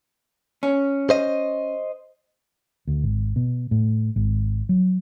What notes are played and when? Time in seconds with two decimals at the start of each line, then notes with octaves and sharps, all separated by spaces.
0.63 C#4
1.10 C5 D#5
2.87 D2
3.04 G#1
3.36 B2
3.71 A2
4.16 G#1
4.69 F#3